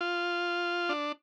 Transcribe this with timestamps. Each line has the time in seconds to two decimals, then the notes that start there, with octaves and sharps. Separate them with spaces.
0.01 F4
0.89 D4